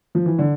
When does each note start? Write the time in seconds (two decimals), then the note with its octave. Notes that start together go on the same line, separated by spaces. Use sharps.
0.15 F3
0.26 E3
0.39 D3